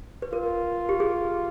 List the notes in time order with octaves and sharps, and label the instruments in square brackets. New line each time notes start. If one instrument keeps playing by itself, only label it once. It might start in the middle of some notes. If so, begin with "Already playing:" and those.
[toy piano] B4
[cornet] F4 [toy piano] A#4
[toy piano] G4
G#4